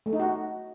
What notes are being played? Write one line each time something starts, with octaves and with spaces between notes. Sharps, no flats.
A3
D#4
F#4